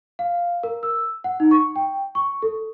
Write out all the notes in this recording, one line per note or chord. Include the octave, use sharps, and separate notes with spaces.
F5
A#4
E6
F#5
D#4
C#6
G5
C#6
A4